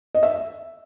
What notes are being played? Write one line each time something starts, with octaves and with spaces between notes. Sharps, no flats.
D#5
E5